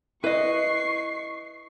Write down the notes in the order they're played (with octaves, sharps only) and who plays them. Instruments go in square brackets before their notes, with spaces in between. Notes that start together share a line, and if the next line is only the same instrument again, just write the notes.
[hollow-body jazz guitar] E4 [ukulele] B4 D#5 [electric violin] C#6 C7